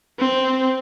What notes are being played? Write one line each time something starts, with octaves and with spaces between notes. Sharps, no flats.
C4